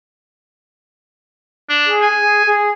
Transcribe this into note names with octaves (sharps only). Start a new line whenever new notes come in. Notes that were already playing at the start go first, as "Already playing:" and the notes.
D4
G#4
G#5
G#4
G#4